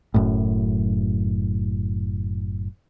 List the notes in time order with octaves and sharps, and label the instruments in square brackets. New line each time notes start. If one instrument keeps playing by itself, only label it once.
[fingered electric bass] F#1 F#2 A2